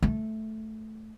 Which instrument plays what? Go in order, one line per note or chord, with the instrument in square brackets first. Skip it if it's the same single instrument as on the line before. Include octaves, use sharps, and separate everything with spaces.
[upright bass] A3